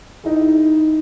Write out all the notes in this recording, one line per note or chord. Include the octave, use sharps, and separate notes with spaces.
D#4 E4 G#4